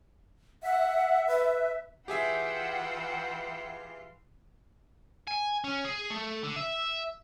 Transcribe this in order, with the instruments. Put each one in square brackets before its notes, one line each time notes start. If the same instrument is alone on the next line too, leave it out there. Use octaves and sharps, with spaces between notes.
[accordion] E5 [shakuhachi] F#5
[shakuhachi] B4
[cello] E3 F4 [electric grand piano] G4 G#4 E5 [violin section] F#5 G5 E6
[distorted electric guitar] G#5
C#4
G#4
A3
D3
E5